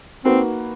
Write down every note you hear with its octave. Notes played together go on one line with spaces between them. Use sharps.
A#3 C4 D#4 F#4 B4